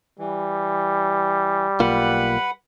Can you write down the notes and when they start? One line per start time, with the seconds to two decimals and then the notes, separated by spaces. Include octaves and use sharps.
0.19 E3 G3
1.80 B1 A#3 F4 B4 F#5 B5